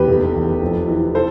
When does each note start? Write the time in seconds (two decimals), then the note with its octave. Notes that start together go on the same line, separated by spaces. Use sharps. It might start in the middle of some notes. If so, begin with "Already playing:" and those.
Already playing: E2 G4 B4
0.08 F1
0.35 E2
0.62 F2
0.88 E3
1.15 A4 C5